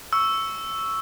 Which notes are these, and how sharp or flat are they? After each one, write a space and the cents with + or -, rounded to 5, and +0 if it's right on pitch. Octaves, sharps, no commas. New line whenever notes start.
C#6 +5 E6 +0